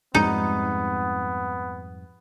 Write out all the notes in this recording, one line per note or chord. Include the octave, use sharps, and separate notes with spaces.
F2 G#2 G3 B3 D#4